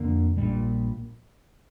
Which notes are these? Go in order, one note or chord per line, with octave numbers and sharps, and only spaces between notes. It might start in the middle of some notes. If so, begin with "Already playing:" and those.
Already playing: F2 D3 A#3
A#1 A#2 G3